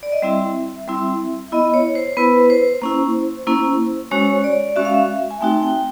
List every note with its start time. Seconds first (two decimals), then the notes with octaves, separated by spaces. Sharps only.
0.03 D5
0.12 D#5
0.22 G3 C4 E4 E5
0.88 G3 C4 E4
1.52 B3 E4 D#5
1.74 C#5
1.95 C5
2.17 B3 E4 B4
2.50 C5
2.82 A#3 C#4 E4
3.47 A#3 C#4 E4
4.11 G#3 C#4 F#4 C#5
4.44 D5
4.76 G#3 C#4 F#4 E5
4.85 F5
4.94 E5
5.31 G#5
5.41 A3 C4 D#4 F#4 G5
5.63 G5